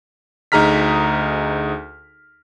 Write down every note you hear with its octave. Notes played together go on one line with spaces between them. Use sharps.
D2 D#4 G#4 A#5 F6 B6